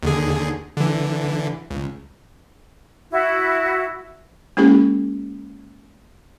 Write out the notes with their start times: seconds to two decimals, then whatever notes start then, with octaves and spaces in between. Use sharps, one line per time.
0.03 D#2 D3 G#4
0.77 D3 E3
1.71 C#2
3.10 E4 F#4
4.57 G#3 A#3 C#4 E4 G4 A4